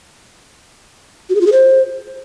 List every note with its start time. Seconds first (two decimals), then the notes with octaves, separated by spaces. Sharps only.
1.30 F#4
1.35 G#4
1.41 F4
1.47 G#4
1.52 C5